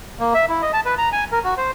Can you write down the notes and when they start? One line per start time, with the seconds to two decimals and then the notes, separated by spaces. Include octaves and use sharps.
0.20 A#3
0.34 E5
0.49 E4
0.62 D#5
0.73 A5
0.85 B4
0.98 A#5
1.12 G#5
1.32 A#4
1.44 F#4
1.57 C5